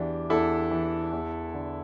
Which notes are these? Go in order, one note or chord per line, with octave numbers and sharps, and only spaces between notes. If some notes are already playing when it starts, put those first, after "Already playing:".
Already playing: E2 E3 D4 G4
E2 E4 A4
E3
E2
D3